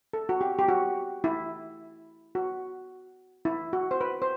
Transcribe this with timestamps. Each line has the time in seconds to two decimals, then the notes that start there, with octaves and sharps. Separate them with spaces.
0.13 A4
0.29 F#4
0.41 G4
0.59 G4
0.68 F#4
1.24 E4
2.35 F#4
3.45 E4
3.73 F#4
3.91 C5
4.01 B4
4.22 C5